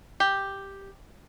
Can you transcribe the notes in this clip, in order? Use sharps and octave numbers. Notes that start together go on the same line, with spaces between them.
G4